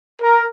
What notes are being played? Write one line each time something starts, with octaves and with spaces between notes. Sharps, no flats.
A#4